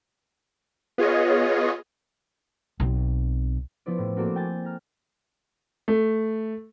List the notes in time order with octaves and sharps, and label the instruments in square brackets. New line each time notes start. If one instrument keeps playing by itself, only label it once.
[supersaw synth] B3 F4 G#4 C#5 D#5
[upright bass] B1 C4
[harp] F3 B3 E4 C5 D5
A2
A3 A#3 C4 F#4 A4 D5
G5 G#5 G#6 A6
A#5 F6
[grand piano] A3